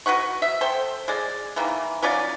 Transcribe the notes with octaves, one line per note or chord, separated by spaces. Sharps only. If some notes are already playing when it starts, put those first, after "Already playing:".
F#4 B4 F#5 C#6
E5
A4 C5 G5
G#3 D5
D#3 E3 A#3
F#3 C#4 F4 D5